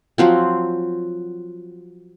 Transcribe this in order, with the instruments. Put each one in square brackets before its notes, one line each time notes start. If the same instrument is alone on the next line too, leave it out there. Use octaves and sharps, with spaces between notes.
[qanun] F3 F#3 C4